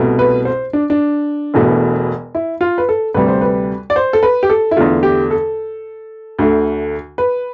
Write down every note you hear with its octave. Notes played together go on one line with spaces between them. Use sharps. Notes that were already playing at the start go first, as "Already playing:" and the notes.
Already playing: C2 B2 A3
B4
C5
D4
D4
E1 E2 B2 A3
E4
F4
B4
A4
D2 C3 G3 B4
C5
B4
D5
C5
A4
B4
G4
A4
E4
E2 D3 A3 F4
G4
A4
D2 D3 A3
B4